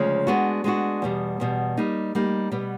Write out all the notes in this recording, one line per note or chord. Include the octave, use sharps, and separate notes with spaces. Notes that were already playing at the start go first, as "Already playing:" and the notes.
Already playing: D2 C#3 F3 G#3
G#3 B3 D4 F#4
G#3 B3 D4 F#4
E2 B2 G3
E2 B2 G3
G3 A#3 D#4
G3 A#3 D#4
B2 G3 B3